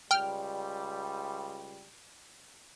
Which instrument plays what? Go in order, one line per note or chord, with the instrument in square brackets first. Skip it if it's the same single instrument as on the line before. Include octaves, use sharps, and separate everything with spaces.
[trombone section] C#2 G3 [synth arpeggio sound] G5 F6